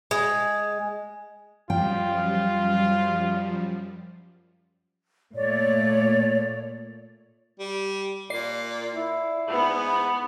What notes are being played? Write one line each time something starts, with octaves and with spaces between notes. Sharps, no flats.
G#3
F#2 F3 G3 F4 G5
A#2 A3 C#5 D5
G3
A#2 D5 C7
E4
G#2 B3